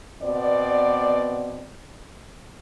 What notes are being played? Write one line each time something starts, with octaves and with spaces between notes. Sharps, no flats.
B2 B3 C4 D5